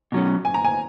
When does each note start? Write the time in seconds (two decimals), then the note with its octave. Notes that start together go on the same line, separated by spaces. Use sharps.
0.12 B2 F#3 C#4
0.45 G#5
0.54 A#5
0.65 G#5